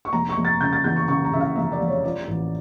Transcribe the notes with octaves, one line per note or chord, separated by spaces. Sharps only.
C#6
F1 A#5
C#6
F1
A6
C#3 G6
A6
E2 G6
C#6
C#3 C#6
A#5
C#3 E5
F5
F1 E5
D5
F1
C#5
F3 D5
A1